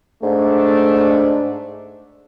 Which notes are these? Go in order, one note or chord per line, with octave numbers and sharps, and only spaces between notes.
G#2 A3 D4